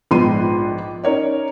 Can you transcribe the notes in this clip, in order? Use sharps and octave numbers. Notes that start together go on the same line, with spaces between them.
A#1 G#2 B3 C6 D#7
C#4 D#4 A#4 C#5 D5